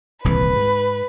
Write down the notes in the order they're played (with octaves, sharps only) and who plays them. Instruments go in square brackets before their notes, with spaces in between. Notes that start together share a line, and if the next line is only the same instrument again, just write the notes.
[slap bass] D#1 C2 E3 [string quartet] B4
[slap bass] G#2